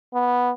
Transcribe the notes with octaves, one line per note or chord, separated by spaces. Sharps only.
B3